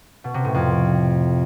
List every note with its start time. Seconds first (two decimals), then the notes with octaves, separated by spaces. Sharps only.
0.24 B2
0.34 C3
0.44 A2
0.54 F2